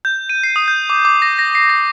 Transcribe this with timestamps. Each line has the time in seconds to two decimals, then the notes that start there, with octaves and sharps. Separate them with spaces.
0.05 G6
0.29 D#7
0.43 C7
0.56 D#6
0.68 G6
0.90 D6
1.05 D6
1.22 A#6
1.39 A#6
1.55 C7
1.70 A#6